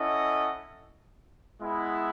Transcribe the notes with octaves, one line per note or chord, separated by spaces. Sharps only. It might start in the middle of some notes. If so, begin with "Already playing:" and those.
Already playing: C#4 E4 A4 D#5 F#5
G#3 B3 E4